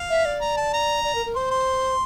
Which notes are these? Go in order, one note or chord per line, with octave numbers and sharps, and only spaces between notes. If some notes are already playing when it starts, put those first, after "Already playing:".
Already playing: F5
E5
D5
A#5
A5
A#5
D5
A#4
A#4
C5 C6
C6